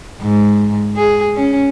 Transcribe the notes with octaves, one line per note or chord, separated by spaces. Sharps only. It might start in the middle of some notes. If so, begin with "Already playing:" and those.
G#2
G#4
C#4